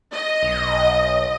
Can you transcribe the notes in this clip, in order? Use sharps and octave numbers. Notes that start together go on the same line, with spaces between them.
D#5
B1